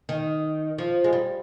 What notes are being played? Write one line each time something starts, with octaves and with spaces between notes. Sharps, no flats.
D#3
F3
G#3
G3